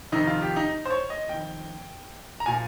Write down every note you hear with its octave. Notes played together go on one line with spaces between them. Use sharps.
F2 C3 D#3 D#4
F4
G4
D#4
C5
C#5
D#5
F2 D#3 G5
A#5
A#2 F3 G#5